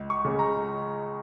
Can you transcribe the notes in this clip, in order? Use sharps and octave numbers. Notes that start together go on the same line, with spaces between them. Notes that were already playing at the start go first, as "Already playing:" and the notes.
Already playing: C#2
C#6
C#3 G#3
A#5